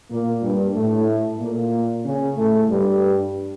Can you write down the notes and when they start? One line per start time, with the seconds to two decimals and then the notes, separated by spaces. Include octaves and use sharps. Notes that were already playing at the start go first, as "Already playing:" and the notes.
0.10 A#2 A#3
0.42 G2 G3
0.75 A2 A3
1.40 A#2 A#3
2.05 C#3 C#4
2.37 A2 A3
2.69 G2 G3